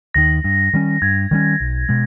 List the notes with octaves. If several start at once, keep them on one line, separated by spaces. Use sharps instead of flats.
D#2 D#3 A#6
G2
D#3 G3 C#4
G2 G#6
D#3 G3 C#4
B1
B2 G#3